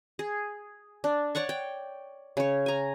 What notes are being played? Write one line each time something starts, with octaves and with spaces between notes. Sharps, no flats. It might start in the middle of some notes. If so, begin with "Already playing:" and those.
G#4
D4
C#5 D5 F#5 C#6
G5
C#3 C#5
G#5 A#5